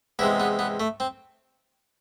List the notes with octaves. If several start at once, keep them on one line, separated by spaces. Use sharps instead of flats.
E2 C3 G#3 E4
B3
B3
A3
C4